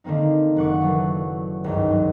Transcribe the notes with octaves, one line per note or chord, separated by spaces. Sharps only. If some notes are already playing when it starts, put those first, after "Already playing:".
D3 D#3 A#3 C4 D#4
F#1 D5 F#5 C#6 D6 C#7
E3 F#3 A3
G#1 C#2 G2
F#3